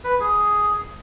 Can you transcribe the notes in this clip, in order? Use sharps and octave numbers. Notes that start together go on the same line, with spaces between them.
B4
G#4